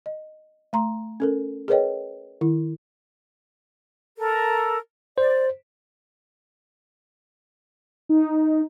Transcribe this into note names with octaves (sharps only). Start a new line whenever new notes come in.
D#5
A3 A#5 C6
C#4 A4 A#4
G#4 A#4 B4 C#5 D#5 G5
D#3 E4
A4 A#4
C5 D5
D#4